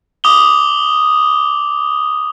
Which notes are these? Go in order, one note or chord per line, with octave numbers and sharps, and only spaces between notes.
D6 D#6 F7 G7